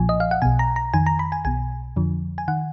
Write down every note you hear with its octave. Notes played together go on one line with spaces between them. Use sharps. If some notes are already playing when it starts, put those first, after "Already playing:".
Already playing: B1 A#2 F3 G#5
D#5
F5
F#5
B1 B2 G#5
A#5
A#5
F2 D#3 G#5
A#5
B5
G#5
B1 B2 G#5
F2 D3 F3
G#5
D#3 F#5